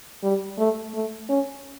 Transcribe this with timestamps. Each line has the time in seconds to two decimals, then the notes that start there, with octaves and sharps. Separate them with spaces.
0.23 G3
0.58 A3
0.94 A3
1.29 C#4